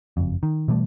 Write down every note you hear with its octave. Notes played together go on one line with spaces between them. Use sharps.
F#1 F2
D#3
B2 E3 G3 A3